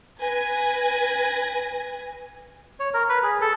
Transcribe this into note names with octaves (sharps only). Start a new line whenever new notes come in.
B4 G#5 G#6 A#6
C#5
A#4
B4
G#4
A4